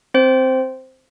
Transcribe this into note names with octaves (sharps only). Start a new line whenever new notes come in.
C4 C5